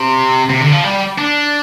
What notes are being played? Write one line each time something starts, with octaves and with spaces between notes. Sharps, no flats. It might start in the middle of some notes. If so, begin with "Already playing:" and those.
Already playing: C3
C3
D3
F3
G3
D4